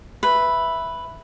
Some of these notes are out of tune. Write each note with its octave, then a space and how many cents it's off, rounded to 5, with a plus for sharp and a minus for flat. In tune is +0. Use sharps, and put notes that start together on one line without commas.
B4 +0 E5 +0